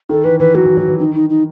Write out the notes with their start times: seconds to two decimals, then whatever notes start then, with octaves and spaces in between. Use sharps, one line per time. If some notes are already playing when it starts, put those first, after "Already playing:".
0.09 D#3 A4
0.24 E3 B4
0.40 E3 B4
0.54 F#3 F#4
0.66 E3
0.77 F#3
0.88 E3
0.99 D#3 D#4
1.15 D#4
1.30 D#4